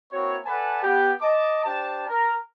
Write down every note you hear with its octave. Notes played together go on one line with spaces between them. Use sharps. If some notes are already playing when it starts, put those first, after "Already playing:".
A#3 C4 E4 F#4 C#5
A4 B4 D5 F#5 G#5 A5
B3 G4
D#5 A5 D6
D4 G4 C5 A5
A#4